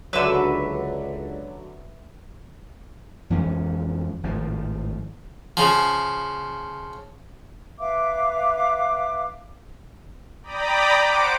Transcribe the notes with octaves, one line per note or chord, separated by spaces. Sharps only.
C#2 D3 F#3 B4 E5 E6
F2 E3 G#3 C#4
G#1 A2 F3
C#3 F3
B4 E5 F5 D6
D5 G5 A#5 B5 D6 D#6
C5 F#5 D6 D7